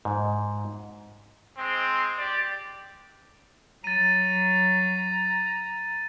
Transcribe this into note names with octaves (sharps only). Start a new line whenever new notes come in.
G#2
G#3 C4
G4 D5
F#3 A#5 A6 D#7